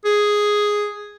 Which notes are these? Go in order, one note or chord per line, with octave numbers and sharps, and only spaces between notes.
G#4